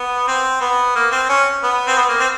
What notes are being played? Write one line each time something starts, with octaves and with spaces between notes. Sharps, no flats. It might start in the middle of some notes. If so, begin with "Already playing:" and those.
Already playing: B3
C4
B3
A#3
C4
C#4
B3
C4
B3
A#3
C4